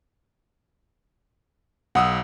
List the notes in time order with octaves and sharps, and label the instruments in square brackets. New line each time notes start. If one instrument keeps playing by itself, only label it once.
[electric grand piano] B1 D#6 E6 [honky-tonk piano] F#5